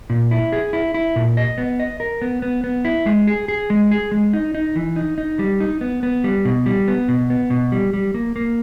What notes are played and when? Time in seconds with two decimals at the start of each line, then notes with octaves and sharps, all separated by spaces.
0.10 A#2
0.31 E4
0.52 G#4
0.73 E4
0.94 E4
1.16 A#2
1.37 D#5
1.58 B3
1.80 D#5
2.00 A#4
2.22 B3
2.42 B3
2.64 B3
2.85 E4
3.06 G#3
3.27 G#4
3.48 G#4
3.70 G#3
3.91 G#4
4.12 G#3
4.33 D#4
4.54 D#4
4.76 E3
4.96 D#4
5.18 D#4
5.39 G3
5.60 D#4
5.81 B3
6.03 B3
6.24 G3
6.45 B2
6.66 G3
6.88 B3
7.08 B2
7.30 B3
7.50 B2
7.72 G3
7.93 G3
8.14 A#3
8.36 A#3